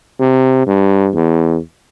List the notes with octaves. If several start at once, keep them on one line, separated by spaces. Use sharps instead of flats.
C3
G2
E2